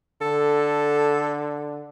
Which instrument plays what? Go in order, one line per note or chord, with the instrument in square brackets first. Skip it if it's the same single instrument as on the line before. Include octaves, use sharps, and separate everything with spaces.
[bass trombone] D3 [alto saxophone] A4